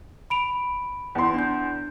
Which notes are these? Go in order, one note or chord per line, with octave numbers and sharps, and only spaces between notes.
B5 D7 F7
E2 C6
D4 G6